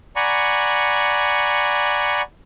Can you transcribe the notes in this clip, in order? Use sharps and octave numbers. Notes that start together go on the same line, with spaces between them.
D5 F#5 G#5 A#5 B5 C#6